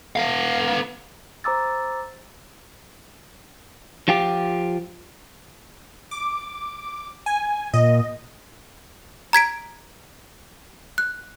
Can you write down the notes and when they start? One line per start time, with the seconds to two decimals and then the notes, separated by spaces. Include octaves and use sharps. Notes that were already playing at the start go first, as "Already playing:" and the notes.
0.16 B3 F5
1.44 C5 A#5 D6 E6 A6
4.08 F3 F4 G4
6.11 D6
7.26 G#5
7.74 A#2 D#5
9.33 A#5 G#6 B6 D7
10.98 F#6